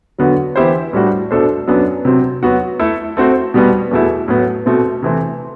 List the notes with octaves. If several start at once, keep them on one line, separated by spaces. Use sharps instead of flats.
D3 F#3 B3 F#4
E3 B3 E4 G4 C5
A2 G3 D4 F#4
B2 A3 D4 A4 C5
F#2 F#3 B3 D4
C3 F#3 C4
F#3 B3 F#4
A3 E4 A4
A3 C4 F#4 C5
B2 G3 B3 F#4
E2 B2 A3 E4
A2 F#3 B3
B2 A3 C4
C3 E3 A3 C4